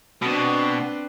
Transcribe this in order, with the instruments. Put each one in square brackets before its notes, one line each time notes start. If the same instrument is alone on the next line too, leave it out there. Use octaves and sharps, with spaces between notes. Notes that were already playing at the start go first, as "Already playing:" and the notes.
[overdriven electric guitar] B2 [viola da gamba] C4 D4 B4